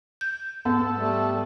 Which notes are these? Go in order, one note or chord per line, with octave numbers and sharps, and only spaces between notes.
G6
G#2 B3 A4
G3 A3